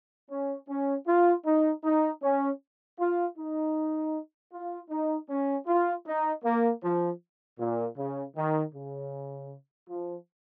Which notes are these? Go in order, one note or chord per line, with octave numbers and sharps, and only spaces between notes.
C#4
C#4
F4
D#4
D#4
C#4
F4
D#4
F4
D#4
C#4
F4
D#4
A#3
F3
A#2
C#3
D#3
C#3
F3